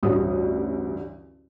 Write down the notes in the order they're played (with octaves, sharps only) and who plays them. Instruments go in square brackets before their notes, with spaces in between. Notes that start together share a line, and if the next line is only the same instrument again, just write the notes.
[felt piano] A1 D2 G2 D#6